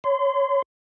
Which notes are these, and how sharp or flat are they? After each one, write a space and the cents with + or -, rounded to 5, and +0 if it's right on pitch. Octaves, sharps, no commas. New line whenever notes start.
C#5 +0 C6 -35